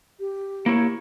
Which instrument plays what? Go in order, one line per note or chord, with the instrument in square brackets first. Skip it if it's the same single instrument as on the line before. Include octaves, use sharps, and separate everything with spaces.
[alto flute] G4
[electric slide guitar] A#3 E4 C#5